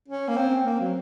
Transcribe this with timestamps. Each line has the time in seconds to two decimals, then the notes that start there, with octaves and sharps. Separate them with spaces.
0.08 C#4
0.28 A#3
0.36 C4
0.66 A#3
0.80 F#3